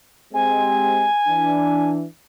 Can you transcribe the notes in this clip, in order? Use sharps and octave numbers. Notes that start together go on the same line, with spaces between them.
G#3 C4 G4 G#5
E3 D4